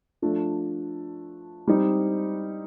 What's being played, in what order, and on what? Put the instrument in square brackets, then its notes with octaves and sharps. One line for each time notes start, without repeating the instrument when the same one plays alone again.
[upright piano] F3 A3 D4
G3 C4 D#4